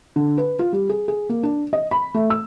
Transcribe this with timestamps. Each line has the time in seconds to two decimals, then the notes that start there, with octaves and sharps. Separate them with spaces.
0.16 D3
0.38 B4
0.59 F4
0.73 G3
0.89 G#4
1.08 G#4
1.29 A#3
1.43 D4
1.73 D#5
1.91 B5
2.14 A3
2.30 E6